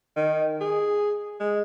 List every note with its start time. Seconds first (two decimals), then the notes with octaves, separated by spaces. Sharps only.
0.16 D#3
0.61 G#4
1.40 G#3